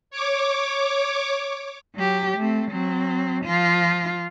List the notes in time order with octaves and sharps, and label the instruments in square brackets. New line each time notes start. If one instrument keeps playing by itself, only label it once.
[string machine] C#5 D6
[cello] F#3 G4
A3 C4
F#3 C4
F3 F4